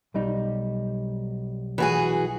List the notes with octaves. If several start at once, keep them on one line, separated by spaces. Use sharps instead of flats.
B1 G3 D#4
E3 F#4 G#4